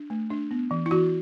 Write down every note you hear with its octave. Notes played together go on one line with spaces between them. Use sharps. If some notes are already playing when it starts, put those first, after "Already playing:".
Already playing: D4
A3
D4
B3
E3
E4
E3 F#4